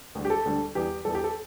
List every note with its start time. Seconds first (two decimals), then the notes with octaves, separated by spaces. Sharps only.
0.15 D2 D3 G3
0.25 G4
0.30 A4
0.45 D2 D3 G3
0.75 E2 E3 G3 G4
1.05 E2 E3 G3 A4
1.15 G4
1.24 A4